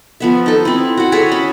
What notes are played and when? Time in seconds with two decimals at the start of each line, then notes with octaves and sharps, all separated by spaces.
0.20 F3 B3 E5
0.46 D#4 A4
0.65 C4 E4
0.97 F#4 F#5
1.12 G#4 A4 C#5 E5
1.32 C#4 B5